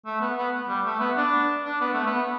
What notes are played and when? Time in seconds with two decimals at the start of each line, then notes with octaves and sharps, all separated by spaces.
0.06 A3
0.21 B3
0.38 B3
0.68 G3
0.85 A3
1.00 B3
1.17 D4
1.65 D4
1.81 B3
1.93 A3
2.06 B3